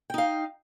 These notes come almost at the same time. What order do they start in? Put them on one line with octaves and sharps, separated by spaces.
G5 D#4 F5